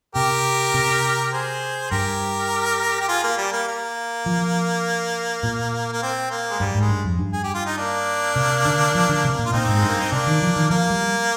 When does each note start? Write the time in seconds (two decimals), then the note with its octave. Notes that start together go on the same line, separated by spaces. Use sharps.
0.15 C3 G4 A#4
0.74 C3
1.32 G#4 C5
1.91 G2 G4 A#4
3.01 G4
3.08 F4 G#4
3.24 A#3
3.38 G3
3.53 A#3
3.68 A#3
4.26 F3
5.43 A#2
5.92 A#3
6.02 C4
6.31 A#3
6.50 G#3
6.60 G2 G3
6.75 G#2
6.80 G#3
6.89 G2
7.04 F2
7.19 G2
7.33 G#4
7.44 G4
7.54 F4
7.66 D#4
7.77 A#3 D4
8.36 C3
8.65 D3
8.95 F3
9.09 D3
9.24 C3
9.39 A#2
9.46 F4
9.53 A#2 C4 D#4
9.68 G#2
9.76 G#3
9.83 G2
9.88 A#3
10.00 C4
10.11 C3 A#3 D4
10.27 D#3
10.42 F3
10.56 D#3
10.70 F3 A#3
10.90 G3